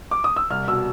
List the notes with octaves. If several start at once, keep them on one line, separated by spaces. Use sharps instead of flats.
D6
D#6
E6
C2 F6
B2 E6